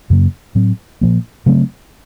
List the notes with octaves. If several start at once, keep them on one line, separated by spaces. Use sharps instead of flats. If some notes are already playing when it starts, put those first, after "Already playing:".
F#2 C#3 F#3 A#3
A2 F#3 C4
A#2 F3 A#3
C#3 F#3 A3 C4